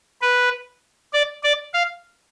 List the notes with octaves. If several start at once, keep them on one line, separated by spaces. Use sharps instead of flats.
B4
D5
D5
F5